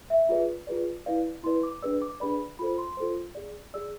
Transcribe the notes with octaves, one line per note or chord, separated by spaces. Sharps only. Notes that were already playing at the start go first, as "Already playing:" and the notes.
E5
F4 G#4 B4 D5
F4 G#4 B4 D5
E4 B4 D5 F5
E4 B4 D5 C6
D6
D4 G#4 B4 D5 E6
D6
D4 G#4 B4 D5 B5
F4 A4 C5 B5
C6
F4 A4 C5
G#4 D5
G#4 D5 E6